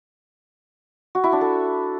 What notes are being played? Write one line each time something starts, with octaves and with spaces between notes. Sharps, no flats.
F#4
E4
D4
A4